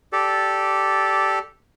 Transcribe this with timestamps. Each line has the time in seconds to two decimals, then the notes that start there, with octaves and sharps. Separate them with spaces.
0.13 G4 A4 D5